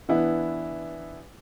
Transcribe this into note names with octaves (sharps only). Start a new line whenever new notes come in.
E3 B3 D4 E4